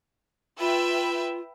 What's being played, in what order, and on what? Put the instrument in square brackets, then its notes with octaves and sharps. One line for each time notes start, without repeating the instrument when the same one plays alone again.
[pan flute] F4 [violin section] B4 E5 G5